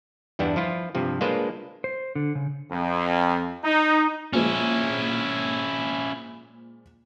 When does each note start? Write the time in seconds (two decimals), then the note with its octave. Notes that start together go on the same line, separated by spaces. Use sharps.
0.39 E2 G2 G3 B3 D4 E4
0.56 F3 E4 F4
0.95 G2 C3 F3
1.21 G#3 A#3 D4 F4 B4 C5
1.84 C5
2.15 D3
2.35 C#3
2.71 F2
3.63 D#4
4.33 A#2 F3 G#3 C#4 E4